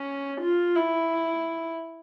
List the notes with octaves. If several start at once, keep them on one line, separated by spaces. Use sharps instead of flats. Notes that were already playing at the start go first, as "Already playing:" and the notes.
Already playing: C#4
F4
E4